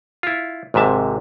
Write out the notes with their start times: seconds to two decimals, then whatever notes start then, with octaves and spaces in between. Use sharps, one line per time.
0.23 E4 F4
0.74 G#1 G#2 C3 E5 A5